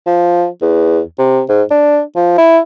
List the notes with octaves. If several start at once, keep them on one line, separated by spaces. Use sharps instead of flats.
F3
E2
C3
G#2
D4
F3
E4